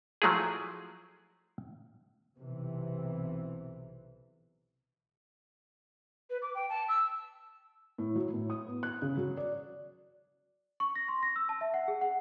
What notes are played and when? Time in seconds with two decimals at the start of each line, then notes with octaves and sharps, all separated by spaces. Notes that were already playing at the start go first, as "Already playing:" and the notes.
0.22 F3 F#3 A3 E4 G#4
2.37 B1 C3 E3
6.30 B4
6.42 D6
6.55 G5
6.69 A5
6.89 E6
7.98 A2
8.15 F#3
8.34 A2
8.50 D#6
8.66 B3
8.83 F#6
9.02 C#3
9.17 F#3
9.37 D5
10.80 C#6
10.96 A#6
11.09 C6
11.23 A#6
11.36 E6
11.49 A5
11.61 E5
11.74 F#5
11.88 G#4
12.01 F#5